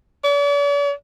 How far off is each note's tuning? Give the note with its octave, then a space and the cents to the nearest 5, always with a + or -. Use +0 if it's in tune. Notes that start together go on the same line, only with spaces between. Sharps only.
D5 -45